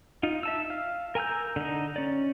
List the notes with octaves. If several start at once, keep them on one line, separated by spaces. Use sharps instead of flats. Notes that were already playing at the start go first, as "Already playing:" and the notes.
D#4 F4
E5 A5 E6
F5
A#4 G#5 A#5 E6 G6
D3 D#4
C#4 D5